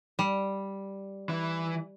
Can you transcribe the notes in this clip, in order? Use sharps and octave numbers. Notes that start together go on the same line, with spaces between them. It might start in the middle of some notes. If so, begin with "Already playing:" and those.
G3
E3